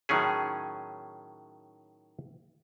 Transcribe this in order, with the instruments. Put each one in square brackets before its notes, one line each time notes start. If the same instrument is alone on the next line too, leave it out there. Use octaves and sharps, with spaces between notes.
[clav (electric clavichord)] A2 D#3 F#3 C#4 G#4